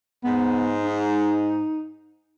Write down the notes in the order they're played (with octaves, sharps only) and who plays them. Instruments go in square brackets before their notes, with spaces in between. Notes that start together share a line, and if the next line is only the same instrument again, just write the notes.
[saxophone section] G#2 [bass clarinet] B3
[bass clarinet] D#4